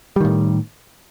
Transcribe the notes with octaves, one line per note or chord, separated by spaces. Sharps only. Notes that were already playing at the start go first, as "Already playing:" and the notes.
A2 D#3 G3